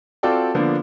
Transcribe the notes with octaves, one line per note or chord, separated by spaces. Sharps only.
C4 F4 F#4 A4 D5 G5
D3 F3 A#3 B3 D4